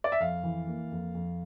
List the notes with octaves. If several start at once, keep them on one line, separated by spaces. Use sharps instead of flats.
D5
E5
F2 F5
E3
A#3
F2
F2